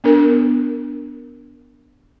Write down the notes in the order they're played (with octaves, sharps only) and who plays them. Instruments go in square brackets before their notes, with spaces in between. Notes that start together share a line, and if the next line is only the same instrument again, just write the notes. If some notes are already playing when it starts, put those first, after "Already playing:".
[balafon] B3 D4 A#4